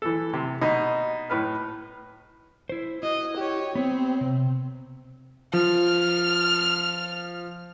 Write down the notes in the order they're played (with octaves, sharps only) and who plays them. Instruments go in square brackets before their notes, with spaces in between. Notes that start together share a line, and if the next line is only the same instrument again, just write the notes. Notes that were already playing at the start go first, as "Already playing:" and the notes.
[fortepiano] E3 A4
C3
B2 D#4
A2 B4 F6
[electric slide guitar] E4 C5
[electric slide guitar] E4 F#4 [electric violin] D#5
[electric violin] G4 C#5
[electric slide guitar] B3 C#5 [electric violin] C4
[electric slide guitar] C3
[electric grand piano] F3 [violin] F6